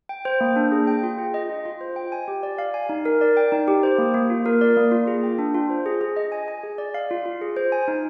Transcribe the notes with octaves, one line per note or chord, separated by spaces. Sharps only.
G5
C5
A#3
D4
G#4
G5
F4
G#4
D#5
F4
F4
C5
G5
G#5
G4
D5
F5
G#5
D#4
A#4
D5
G5
D#4
G4
C5
A#3
A#3
F4
A#4
D5
A#3
F4
G#4
G5
D4
F4
C5
G#4
G#4
D#5
G#5
G#5
G#4
D5
F5
F4
F4
G#4
C5
G#5
D#4